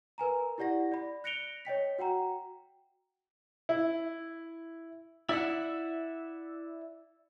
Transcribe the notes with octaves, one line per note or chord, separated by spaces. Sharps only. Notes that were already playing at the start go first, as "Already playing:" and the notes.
A#4 B4 G#5 A#5
E4 G4 D5 F#5 A#6
D5 B5
F#6 A#6 C#7 D7 F7 G7
C#5 D#5 G5 B6
F#4 F#5 G5 A#5
E4
E4 D5 E5 F#5